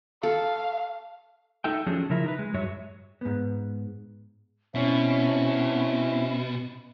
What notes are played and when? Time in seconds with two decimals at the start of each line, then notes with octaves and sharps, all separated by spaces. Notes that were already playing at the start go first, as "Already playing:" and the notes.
0.23 A4 F5
1.64 D#4 A4 E5 G5
1.86 F3 F#3 C#4 D4 G#4 A4
2.10 C#3 F3 E4 A#4 E5
2.24 D#4 A#4 B4
2.39 G#3
2.54 G2 F#3 C#5 E5
3.21 G#2 B3
4.75 B2 C4 C#4 E4